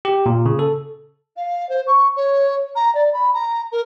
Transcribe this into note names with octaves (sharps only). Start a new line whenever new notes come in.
G4
A#2
C#3
A4
F5
C5
C#6
C#5
A#5
D5
B5
A#5
A#4